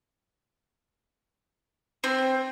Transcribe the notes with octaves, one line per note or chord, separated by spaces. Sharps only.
C4